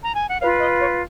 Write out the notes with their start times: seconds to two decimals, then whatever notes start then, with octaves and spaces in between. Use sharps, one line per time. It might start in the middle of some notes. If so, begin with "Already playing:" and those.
0.02 A#5
0.14 G#5
0.27 F#5
0.40 B4 C#5 F5
0.44 F4
0.59 D#5
0.79 C#5